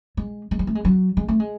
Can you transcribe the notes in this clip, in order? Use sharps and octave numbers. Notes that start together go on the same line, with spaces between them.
G#3
G#3
G3
A3
G#3
F#3
G#3
A3
G#3